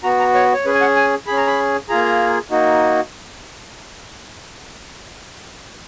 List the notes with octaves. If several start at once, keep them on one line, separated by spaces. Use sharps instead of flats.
B3 F#4 A#5
A#5
C#5
C#5
C#4 G#4 B4
G#5
F#5
G#5
C#4 G#4 B5
A#5
B5
A#3 F4 G#4 A#5
A#3 D#4 F#4